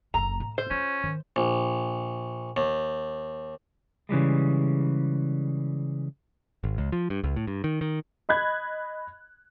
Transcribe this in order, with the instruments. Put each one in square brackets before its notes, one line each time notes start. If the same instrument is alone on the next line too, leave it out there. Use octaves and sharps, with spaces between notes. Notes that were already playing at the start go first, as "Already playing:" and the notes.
[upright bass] F#1 A#3 [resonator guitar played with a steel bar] A#5
[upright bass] A2
[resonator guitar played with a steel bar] C5
[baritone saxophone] C#4 [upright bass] F4
[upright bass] D#3
[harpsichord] A#1
D#2
[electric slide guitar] C#3 E3 G3 G#3
[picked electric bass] G#1
C#2
F3
G2
C#2
A2
G2
D#3
D#3
[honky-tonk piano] D#5 B5 F#6 G#6